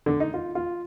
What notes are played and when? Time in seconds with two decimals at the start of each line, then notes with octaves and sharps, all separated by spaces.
0.06 D3
0.20 D#4
0.34 F4
0.55 F4